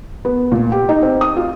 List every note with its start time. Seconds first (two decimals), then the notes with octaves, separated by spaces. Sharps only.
0.25 B3
0.52 A#2
0.72 G4
0.89 D#4
1.03 C4
1.21 D#6
1.37 F4